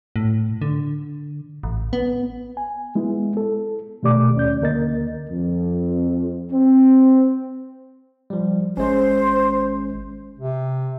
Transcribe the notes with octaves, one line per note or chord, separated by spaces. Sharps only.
A2
D3
A1
B3
G#5
G#3 B3 E4
A4
B2 D#3 A3 G4 D5 D6
D#2 C#4 D5 G6
D2 D3 A#3 A#4 D#5 A6
F2
C4
F3 G3
G#1 G#3 C#4 C5
C3